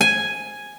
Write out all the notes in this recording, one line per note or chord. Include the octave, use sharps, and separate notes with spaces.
G#5